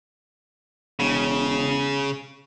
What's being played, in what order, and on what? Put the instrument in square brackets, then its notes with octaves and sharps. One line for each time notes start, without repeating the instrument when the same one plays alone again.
[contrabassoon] E1 [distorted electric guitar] C#3